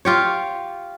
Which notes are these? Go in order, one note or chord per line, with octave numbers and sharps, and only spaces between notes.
F4 G4 C#5